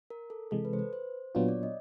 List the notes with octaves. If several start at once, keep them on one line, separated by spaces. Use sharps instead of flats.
A#4
A4
C3 E3 G#3 A4
B4
C5
B4
C5
A#2 F#3 B3 D4 F4 C#5
D5
D#5